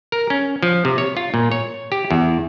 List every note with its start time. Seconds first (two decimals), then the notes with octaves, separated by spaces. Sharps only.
0.12 A#4
0.30 C#4
0.63 F3
0.85 C3
0.98 C#5
1.17 F4
1.34 A#2
1.52 C#5
1.92 G4
2.11 E2